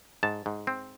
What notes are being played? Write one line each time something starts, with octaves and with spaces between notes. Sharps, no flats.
G#2 A5
G#2
C4